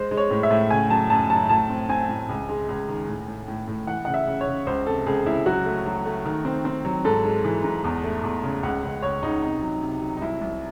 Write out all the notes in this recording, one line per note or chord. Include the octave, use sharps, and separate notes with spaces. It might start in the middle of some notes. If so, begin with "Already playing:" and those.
Already playing: G#3 C5
G#3
C#5
A2
E5
A2
C#3 G#5
F#3 A5
F#2 A5
F#3 A5
A2 A5
C4
C4 G#5
A2
C#2
G#3
C#2
D#3
A2
A2
A2
A2
E3 F#5
C#3 F#5
E5
C#3
C#5
C#3
C#2 C5
C3 A4
C#2 G#4
C#2 E4
F#3 F#4
A3
F#3
A3
D#3
C4
C4
F#3
G#2 A4
G#3
E3
G#2
E2
A3
E2
C#3
C#2 F#5
C#2
C#2 C#5
C#2 D#4
C3 D#4
F#3
C3
F#3
D#4
C2 E4
C2